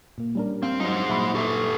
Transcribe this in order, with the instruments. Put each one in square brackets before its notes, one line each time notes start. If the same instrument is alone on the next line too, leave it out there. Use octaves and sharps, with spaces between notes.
[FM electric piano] A#2 A#3
[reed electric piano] G3 [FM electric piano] C#4 D4 A#4
[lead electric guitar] C4 [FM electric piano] F5
[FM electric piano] F#3 C6 [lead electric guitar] D#4 C5
[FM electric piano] A#2 F#3 [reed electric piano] E5 B5 C6
[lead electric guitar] G4 A4 [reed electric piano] E5 C#6